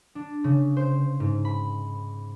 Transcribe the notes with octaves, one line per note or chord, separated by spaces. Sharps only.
D4
C#3
C5
G#2
B5